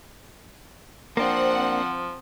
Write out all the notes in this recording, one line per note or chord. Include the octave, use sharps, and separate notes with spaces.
F3 A#3 C4 D4 F#5